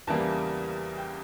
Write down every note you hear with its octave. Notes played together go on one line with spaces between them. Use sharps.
E2 C#3 E3 G3 A#3 A5
G5